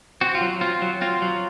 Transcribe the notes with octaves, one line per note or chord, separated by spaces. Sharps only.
C4 F#4
F4
F#3
C4 F4
F#3
C4 F4
F#3